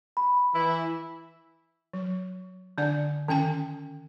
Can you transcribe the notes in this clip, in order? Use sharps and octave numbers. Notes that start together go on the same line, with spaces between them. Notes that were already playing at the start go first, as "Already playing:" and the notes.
B5
E3 E4
F#3
D3 D4 D5 F#5
D#3 C#4 G5 G#5